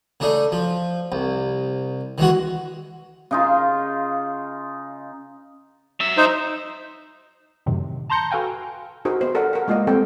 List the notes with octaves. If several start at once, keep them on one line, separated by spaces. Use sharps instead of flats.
C#3 A3 D4 D#4
F3
C2
D#3 E3 G#3 F#4
C#3 D#4 F4
F#3 E5
D#4 C5
F#2 A2 C3 D#3 F#3
A5 A#5 C6 G6 A#6 C#7
F#4 A4 B4 F5 G5 G#5
D#4 F#4 G#4 A#4 C5
B3 C5
A4 A#4 D5 F#5
A#4 F#5
G#3 A#3 F4 D5 D#5
G3 C4 A4 G5